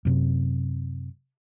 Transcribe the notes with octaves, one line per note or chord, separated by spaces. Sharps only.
F#2 C3